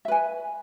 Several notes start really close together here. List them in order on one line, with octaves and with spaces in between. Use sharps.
E5 B4 G#5